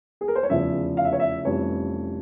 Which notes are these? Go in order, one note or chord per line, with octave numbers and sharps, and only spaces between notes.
G#4
A#4
C5
C#5
F1 E2 C#3 F3 E5
F5
E5
C#5
E5
F1 F2 E3 G3 C#4 C#5